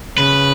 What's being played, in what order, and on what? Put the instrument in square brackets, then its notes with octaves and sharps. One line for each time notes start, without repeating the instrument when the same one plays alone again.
[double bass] C#3 [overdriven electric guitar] B4